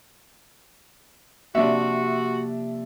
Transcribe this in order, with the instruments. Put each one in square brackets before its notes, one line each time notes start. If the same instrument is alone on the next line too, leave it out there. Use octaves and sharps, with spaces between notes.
[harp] C3 F3 A#3 [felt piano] D4 E5 [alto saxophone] F#4